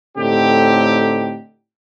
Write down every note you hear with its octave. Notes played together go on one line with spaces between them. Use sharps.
A2 D3 C4 D#4 G4